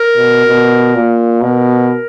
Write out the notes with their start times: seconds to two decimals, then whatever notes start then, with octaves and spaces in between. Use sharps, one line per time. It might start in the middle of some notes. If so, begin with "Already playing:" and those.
Already playing: A#4
0.16 B2
0.47 B2
0.95 A#2
1.41 B2 A#4